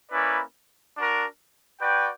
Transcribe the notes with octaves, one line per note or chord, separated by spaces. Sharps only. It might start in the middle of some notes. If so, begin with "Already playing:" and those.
A#3 C#4 E4 B4 D5
D4 F#4 A#4
F#4 B4 D5 G5